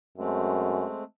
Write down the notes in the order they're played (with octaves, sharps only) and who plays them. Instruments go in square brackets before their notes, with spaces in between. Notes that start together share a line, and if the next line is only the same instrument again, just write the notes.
[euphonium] F#2 [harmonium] G#3 A3 C4